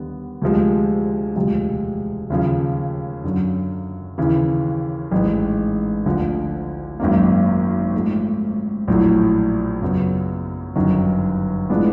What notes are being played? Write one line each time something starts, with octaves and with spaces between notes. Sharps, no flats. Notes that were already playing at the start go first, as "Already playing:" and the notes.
Already playing: D#2 D3 G3 B3
D2 C3 F3 G#3
E1 D2 C3 F3 G#3
D#2 C#3 F3
F#2 D3 F#3
D#2 C#3 E3
A1 G#2 D#3 G#3
D2 D3 F3
G#1 F#2 D#3 F#3 A#3
G#2 F3 A3
A#1 A2 F#3
F#2 C#3 F#3 B3
G1 F#2 D#3 F#3
A2 F3 G#3 B3 D4